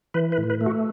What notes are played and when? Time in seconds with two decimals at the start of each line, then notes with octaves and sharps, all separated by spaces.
0.14 E3 B4
0.32 B4
0.38 A2
0.50 B4
0.61 A3
0.66 F#4